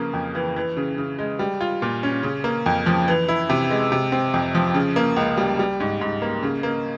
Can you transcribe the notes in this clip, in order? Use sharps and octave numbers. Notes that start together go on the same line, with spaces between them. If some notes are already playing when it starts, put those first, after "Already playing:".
Already playing: C#3 F3 A#3
F2
E3
E3
C#3
C#3
G#3
G3
F4
A#2
C#4
C#3
A#3
F2
F3
E3
E4
C3
G#3
C3
C4
F2
F3
C#3
A#3
C#2
G3
G3
G#2
G#2
A#3
C#3
A#3